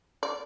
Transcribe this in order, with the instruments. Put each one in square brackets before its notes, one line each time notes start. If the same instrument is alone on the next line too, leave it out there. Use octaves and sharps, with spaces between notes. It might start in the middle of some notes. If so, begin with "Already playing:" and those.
[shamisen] D5